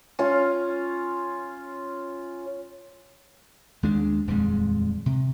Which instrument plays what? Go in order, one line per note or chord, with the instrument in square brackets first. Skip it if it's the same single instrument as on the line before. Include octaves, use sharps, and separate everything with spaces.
[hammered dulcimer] C#4 F4
[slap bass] D#2 G#3 D4
D#1 F2 G3 G#3
C3